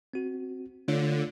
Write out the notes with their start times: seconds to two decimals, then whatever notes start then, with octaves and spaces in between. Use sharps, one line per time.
0.14 C4 F#4
0.88 D3 A3 F4 C#5